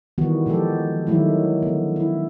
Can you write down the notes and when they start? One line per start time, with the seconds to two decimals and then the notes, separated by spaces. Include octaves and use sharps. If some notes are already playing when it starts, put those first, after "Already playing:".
0.18 D#3 E3 G3 A#3 B3 F#4
0.46 A#2 F3 G#3 G4 A4
1.07 D#3 F#3 G#3 A3 E4
1.63 D3 B3
1.96 E4